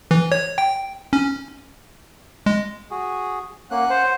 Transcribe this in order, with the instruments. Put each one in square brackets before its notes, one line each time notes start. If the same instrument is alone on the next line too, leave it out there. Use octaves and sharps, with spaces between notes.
[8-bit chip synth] E3
C#5
G5
C#4
G#3
[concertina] F#4 G#4
[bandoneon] A#3 [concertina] C#4 F#6 [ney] F#5
[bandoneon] C5